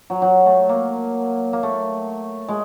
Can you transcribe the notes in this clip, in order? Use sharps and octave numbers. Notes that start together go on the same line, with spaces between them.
F#3
F#3
A3
A#3
A#3
A3
G#3